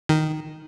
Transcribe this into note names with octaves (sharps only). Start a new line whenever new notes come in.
D#3